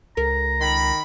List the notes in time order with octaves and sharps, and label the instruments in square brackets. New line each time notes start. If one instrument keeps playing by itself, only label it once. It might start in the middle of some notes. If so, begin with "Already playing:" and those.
[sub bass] C#2 [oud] A#4 [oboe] A#5
[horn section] D#3 B5